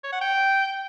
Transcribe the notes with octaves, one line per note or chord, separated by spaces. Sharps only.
C#5
F#5
G5